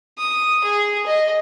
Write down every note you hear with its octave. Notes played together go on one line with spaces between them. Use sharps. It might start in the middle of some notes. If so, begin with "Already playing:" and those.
D#6
G#4
D#5